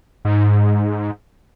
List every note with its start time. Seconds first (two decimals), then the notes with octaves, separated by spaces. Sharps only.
0.25 G#2